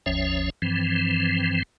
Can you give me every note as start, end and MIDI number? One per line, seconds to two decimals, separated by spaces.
0.06 0.50 31
0.06 0.50 39
0.06 0.50 53
0.06 0.50 61
0.06 0.50 73
0.06 0.50 76
0.62 1.63 43
0.62 1.63 52
0.62 1.63 53
0.62 1.63 60